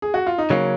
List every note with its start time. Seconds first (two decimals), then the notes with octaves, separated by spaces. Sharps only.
0.02 G#4
0.14 F#4
0.26 F4
0.38 D#4
0.50 C#3 F#3 A#3 C#4